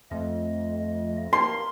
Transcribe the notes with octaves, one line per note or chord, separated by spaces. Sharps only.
F2 A3 D#5
A#3 C6